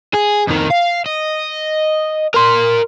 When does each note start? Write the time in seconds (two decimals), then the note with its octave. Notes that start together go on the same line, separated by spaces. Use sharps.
0.14 G#4
0.47 F2 D#3
0.70 F5
1.06 D#5
2.34 A#4 C6